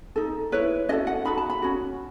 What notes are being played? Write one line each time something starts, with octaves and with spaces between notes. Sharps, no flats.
D#4 A4
E4 B4 C#5
C#4 F#4 A4 D#5
F#5
D#4 F#4 A4 B5
A5
B5
C#4 F#4